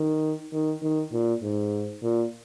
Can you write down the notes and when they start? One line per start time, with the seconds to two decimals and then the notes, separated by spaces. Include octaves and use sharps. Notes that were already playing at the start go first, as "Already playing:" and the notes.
Already playing: D#3
0.53 D#3
0.83 D#3
1.13 A#2
1.42 G#2
2.03 A#2